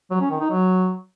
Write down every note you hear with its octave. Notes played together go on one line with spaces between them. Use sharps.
F#3
C#4
D#3
D#4
F#3